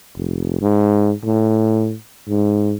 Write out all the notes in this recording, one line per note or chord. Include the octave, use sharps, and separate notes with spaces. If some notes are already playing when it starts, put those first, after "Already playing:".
F1
G#2
A2
G#2